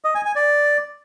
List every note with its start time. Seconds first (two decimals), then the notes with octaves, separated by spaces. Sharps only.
0.04 D#5
0.15 G#5
0.25 G#5
0.36 D5